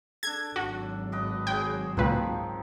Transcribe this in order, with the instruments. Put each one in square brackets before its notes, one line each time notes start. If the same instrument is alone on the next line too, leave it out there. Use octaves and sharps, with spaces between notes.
[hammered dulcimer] D4 A4 [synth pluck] G#6
[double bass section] G#1 F#3 [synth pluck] F#4
[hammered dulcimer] B4 D#5 D6
[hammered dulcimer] G#4 C5 [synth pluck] G5
[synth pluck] C#2 A#2 B4 [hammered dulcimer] D#3 F3 C4